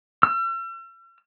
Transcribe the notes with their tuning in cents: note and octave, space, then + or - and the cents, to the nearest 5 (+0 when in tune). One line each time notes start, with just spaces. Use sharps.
E6 +45